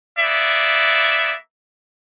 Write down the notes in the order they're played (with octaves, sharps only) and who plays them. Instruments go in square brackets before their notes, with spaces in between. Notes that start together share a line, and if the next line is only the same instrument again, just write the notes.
[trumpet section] A#3 B3 D5 E5